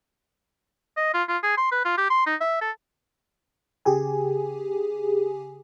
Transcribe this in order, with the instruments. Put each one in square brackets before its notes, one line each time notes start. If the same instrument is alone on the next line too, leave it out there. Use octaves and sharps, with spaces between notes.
[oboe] D#5
F4
F4
G#4
C6
B4
F4
G4
C6
D#4
E5
A4
[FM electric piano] C#3 G4 G#4 G#5